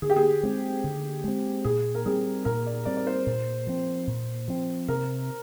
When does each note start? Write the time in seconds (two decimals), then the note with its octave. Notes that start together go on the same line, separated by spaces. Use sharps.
0.02 D3 G#4
0.10 G4
0.16 G#4
0.43 G#3 C4
0.84 D3
1.24 G#3 C4
1.65 A#2 G#4
1.95 A#4
2.06 G3 C4 G#4
2.45 A#2 A#4
2.66 D5
2.85 G3 C4 D5
2.97 D5
3.07 C5
3.26 A#2
3.67 F3 C4
4.07 A#2
4.48 F3 C4
4.88 C3 A#4